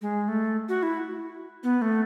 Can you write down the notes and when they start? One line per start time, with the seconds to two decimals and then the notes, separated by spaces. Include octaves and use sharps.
0.02 G#3
0.28 A3
0.69 F#4
0.83 E4
1.63 B3
1.82 A3